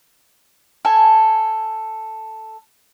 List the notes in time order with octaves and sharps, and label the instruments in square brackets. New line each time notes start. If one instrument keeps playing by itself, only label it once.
[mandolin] A4 G#5